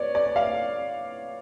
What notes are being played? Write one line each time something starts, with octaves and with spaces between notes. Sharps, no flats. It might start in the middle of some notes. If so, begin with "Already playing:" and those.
Already playing: B4 C#5 D5
D5
F5